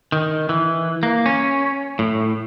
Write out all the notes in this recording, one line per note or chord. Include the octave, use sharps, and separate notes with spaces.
D#3
E3
A#3
C#4
A2